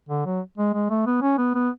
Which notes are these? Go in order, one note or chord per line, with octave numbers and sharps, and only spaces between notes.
D3
F#3
G#3
G#3
A3
B3
C#4
B3
B3